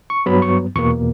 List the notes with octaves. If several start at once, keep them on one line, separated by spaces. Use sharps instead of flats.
C#6
G2 F#3 B3 B5
C#6
E2 B2 A#3 C#6